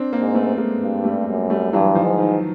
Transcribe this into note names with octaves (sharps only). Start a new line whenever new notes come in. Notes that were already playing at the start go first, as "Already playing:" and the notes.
Already playing: C4 D4
A#3 C4
G#2
A3 B3
G#3 A#3
G2
G3 A3
F#2
G3 A3
G2 E3 F#3
D#3 F3
G#2
D#3